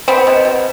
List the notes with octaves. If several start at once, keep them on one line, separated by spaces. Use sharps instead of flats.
B3 C4
B2
B2